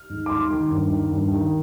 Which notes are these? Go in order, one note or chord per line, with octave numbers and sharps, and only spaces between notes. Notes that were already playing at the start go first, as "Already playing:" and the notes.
Already playing: F6
G#2
D6
G#2 C6
D#3
G2
D#3
G2
D#3